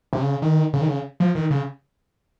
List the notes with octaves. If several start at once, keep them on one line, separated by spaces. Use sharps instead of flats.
C3
C#3
D#3
C#3
D#3
C#3
F3
D#3
C#3